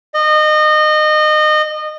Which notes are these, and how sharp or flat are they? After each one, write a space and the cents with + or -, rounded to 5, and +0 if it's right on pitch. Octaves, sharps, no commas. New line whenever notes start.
D#5 -25